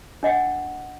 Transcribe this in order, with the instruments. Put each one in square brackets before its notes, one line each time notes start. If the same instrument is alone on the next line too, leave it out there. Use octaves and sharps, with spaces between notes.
[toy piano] D4 D#5 F#5 G5